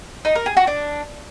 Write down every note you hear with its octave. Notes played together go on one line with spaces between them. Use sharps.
D#4
A#4
G#4
F#4
D4